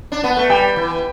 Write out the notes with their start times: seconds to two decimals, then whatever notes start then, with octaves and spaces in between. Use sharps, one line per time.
0.12 D4
0.24 B3
0.37 A3
0.50 G3 G5
0.76 E3